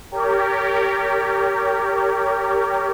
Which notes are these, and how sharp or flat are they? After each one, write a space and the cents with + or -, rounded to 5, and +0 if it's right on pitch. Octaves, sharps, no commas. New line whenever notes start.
G4 +0 A#4 -20 C#5 +30